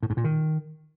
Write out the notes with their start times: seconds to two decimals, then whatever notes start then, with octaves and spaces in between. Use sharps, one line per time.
0.03 A2
0.10 G#2
0.17 A#2
0.24 D#3